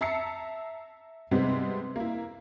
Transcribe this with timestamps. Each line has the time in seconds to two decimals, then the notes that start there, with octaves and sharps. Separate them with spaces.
0.01 E5 A5 A#5 E6 C7 C#7
1.31 C3 G3 G#3 B3 C4 D#4
1.96 A#3 E4